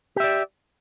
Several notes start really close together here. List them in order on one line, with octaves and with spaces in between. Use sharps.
G4 E5 D5